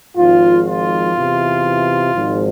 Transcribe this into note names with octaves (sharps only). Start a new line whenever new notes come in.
G#1 G#2 F3 F4
F4
E2 C3 E3
G#1 G#2 F3